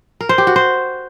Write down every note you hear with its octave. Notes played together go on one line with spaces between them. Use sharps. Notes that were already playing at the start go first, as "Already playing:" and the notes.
A#4
C5
G4
F#4
C5